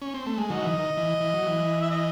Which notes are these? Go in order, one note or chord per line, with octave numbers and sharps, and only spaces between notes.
C#4
C4
A3
G#3
D#3 F#3 D#5
E3
D#3
E3
E3
F#3
E3
E5
D#5